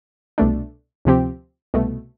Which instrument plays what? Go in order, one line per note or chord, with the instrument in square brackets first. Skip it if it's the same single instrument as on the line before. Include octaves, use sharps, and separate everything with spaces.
[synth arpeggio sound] C2 B2 A3 D4
D2 C3 F3 C4 G4
C2 B2 A3